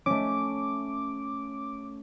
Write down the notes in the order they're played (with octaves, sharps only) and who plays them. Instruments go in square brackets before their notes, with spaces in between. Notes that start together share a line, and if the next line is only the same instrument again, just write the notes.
[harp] A3 C#4 [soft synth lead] D6